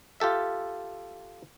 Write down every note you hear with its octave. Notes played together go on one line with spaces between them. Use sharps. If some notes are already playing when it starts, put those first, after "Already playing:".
F4 G4 A4 E5